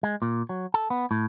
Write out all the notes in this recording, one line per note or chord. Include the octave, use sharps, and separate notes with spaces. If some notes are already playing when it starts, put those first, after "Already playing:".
G#3
A#2
F#3
A4
B3
A2